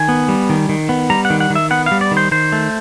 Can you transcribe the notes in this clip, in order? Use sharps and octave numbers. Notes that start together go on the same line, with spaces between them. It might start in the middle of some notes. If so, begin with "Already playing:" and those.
Already playing: D#3 G#5
B3
G3
D#3
D#3
B3
G3 A#5
F#5
D#3
F#5
D#3
E5
B3 F#5
F5
G3
D5
D#3
C5
D#3 C5
A3